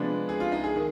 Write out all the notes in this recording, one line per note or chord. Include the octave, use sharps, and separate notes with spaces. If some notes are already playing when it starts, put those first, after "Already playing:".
Already playing: C3 F3 G#3 B3 D4
G#4
F4
D#4
G#4
D#3